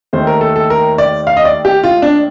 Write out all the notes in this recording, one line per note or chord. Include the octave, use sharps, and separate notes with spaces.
D#2 D#3 A3 C5
A#4
A4
A4
A#4
D5
F5
D#5
D5
G4
F4
D4